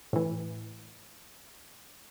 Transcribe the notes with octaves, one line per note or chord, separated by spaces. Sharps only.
A2 E3